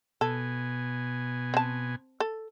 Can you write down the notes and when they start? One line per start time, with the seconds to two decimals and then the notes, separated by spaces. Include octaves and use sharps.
0.21 B2 A4 G#5
1.54 C4 A5
2.20 A4